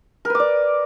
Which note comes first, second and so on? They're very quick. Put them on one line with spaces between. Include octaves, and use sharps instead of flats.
A#4 B4 D6 D5